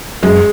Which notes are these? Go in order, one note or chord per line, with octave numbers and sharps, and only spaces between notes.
F#2 G#3